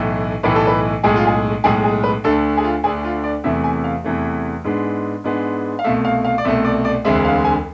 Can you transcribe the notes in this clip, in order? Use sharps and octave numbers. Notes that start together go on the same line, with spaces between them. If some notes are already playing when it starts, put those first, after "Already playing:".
Already playing: B1 A2 E3 A3
B1 A2 E3 A3 B4
A4
B4
B1 A2 G#3 G#4
F4
G#4
B1 A2 G#3 G#4
G#4
B4
D2 D3 A3 D4 A4
G#4
F4
D2 D3 A3 D4 G#4
F4
D5
E2 C3 E3 A3 E5
G#5
F5
E2 C3 E3 A3
G#2 G#3 B3 D4
G#2 G#3 B3 D4
F5
C2 B2 A3 E5
F5
F5
D5
C2 B2 A3 E5
D5
D5
E1 D2 D3 G#3 C4 E5
F5
G#5